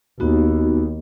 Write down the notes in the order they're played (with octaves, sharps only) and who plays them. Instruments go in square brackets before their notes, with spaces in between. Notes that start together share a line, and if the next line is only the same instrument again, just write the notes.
[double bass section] D#2 [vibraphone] B3 D#4 F#4